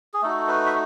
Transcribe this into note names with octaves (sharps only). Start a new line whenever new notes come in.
G#4
A3 D#4 F#4 A4
B4
E5